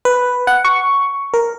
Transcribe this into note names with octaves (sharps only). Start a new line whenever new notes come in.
B4
F#5
C#6
A#4